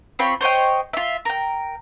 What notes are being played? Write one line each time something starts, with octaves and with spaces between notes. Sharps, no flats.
C4 F4 C#5 B5
C5 C#5 D#5 G5
F4 E5
A#4 G5